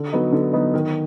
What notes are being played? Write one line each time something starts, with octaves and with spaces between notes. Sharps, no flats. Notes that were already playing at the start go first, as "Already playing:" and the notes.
Already playing: D3
F#3 B3 D#4
D3
F#3 B3 D#4
D#3